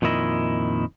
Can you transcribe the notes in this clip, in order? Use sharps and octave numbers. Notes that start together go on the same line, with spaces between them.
F2 A#2 D#3 E4 D#5